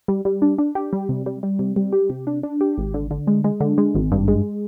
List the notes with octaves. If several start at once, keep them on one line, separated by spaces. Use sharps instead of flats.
G3
G3
D4
D4
G4
G3
C3
G3
G3
C3
G3
G4
C3
D4
D4
G4
G#1
D3
D3
G#3
G#3
D3
G#3
G#1
G2
G#3